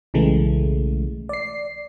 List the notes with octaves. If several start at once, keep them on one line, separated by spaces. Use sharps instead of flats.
B1 C#3 E3 G#3 A3
D5 C7